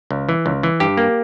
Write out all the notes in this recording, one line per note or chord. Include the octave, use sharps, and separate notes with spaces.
C#2
E3
C#2
E3
G2 G4
A#3